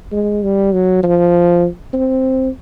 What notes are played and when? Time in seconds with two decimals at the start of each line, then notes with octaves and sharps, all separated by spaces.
0.12 G#3
0.43 G3
0.73 F#3
1.03 F3
1.94 C4